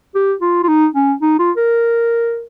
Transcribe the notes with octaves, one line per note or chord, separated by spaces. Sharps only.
G4
F4
F4
D#4
C#4
D#4
F4
A#4